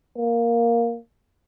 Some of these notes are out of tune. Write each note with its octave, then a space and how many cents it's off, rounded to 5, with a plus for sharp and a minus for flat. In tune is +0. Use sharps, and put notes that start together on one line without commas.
A#3 +0